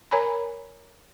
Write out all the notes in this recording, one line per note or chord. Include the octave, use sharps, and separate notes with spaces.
A#4 C#5 G#5 A#5 B5